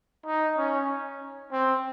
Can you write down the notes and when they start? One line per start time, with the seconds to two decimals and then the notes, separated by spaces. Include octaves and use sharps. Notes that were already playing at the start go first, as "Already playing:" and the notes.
0.26 D#4
0.57 C#4
1.52 C4